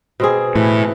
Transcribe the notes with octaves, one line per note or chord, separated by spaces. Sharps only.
B2 C4 G#4
A2 E3